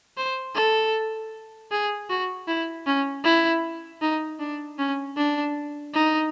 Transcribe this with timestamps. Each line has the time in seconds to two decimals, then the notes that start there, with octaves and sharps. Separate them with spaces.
0.17 C5
0.56 A4
1.71 G#4
2.10 F#4
2.48 E4
2.86 C#4
3.25 E4
4.02 D#4
4.40 D4
4.79 C#4
5.17 D4
5.94 D#4